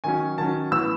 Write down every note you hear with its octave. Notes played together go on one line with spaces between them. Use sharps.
D#3 F#3 C#4 G#5
D#3 F#3 C#4 A5
A2 E3 B3 E6